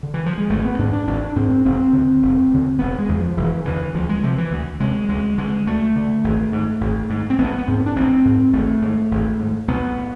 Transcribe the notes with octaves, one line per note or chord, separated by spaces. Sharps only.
D3
E3
F3
G#3
G#1 A3
B3
G#2 D4
D4
G#1 D4
G#2 C4
E1 C4
D2 D3
E1
D2 D3
E1 B3
G#3
E2 D3
F3
E1 E3
E2 D3 E3
D2 F3
G#3
C3 F3
E3
D2
C3 G#3
D2 G#3
D3 G#3
D2 A3
D3
G#1
G#2
G#1
G#2
C4
A1 B3
B3
G#2 C4
D4
A1 C4
G#2
G#1 A3
G#2
G#1
G#2
B1 B3
A2